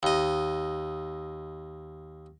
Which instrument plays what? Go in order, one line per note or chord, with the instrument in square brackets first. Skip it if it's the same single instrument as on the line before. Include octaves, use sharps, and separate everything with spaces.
[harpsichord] D#2 D#5